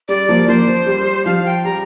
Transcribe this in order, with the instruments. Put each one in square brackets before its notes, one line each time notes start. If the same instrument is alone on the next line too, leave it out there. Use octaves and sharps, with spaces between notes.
[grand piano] G3 [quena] D5
[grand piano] F3 A#3
[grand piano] F3 A#3 [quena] C5
[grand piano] F3
G3
[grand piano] F3 [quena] F5
[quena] G5
[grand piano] G3 [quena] A#5